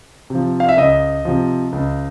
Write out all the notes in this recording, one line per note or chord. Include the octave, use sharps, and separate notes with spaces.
C3 F3
F5
E5
C#2 D#5
C3 F3
C#2